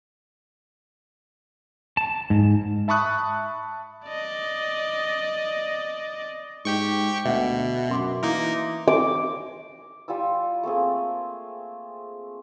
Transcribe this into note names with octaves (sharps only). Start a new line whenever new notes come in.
A5
G#2
E5 A5 B5 C#6 D#6 F#6
D5 D#5
G#2 G4 G5 C#6
D2 B2 E5 F#5
F#2 E5 C6 D6
E3 A#3 D#4 A#4
D6
G3 F4 G#5 E6
A3 A#3 C4 G#4